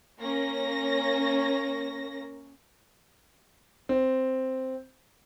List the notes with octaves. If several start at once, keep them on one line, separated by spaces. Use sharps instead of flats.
A#3 C#4 A#6
C4